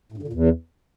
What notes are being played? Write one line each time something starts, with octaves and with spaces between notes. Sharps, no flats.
A2
G2
D3
A#2
E2